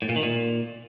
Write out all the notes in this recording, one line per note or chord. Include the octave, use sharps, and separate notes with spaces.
A2
A#2
D#3
A#2